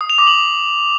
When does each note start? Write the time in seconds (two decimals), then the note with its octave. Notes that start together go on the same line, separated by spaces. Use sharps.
0.01 D#6
0.10 F7
0.18 D6
0.27 F#7